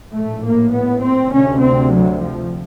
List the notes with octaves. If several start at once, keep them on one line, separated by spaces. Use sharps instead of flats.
A#1 A2 A3
A#3
B3
C4
D2 C3 C#4
C4
F#3
F3